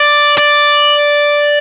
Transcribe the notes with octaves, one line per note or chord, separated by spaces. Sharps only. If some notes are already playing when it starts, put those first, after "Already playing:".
Already playing: D5
D5